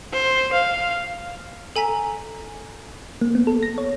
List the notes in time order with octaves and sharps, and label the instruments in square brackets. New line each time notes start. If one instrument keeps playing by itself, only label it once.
[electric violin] C5
F5
[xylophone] A4 G#5 A#5 B6
[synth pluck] A#3
B3
A4
A#6
C#5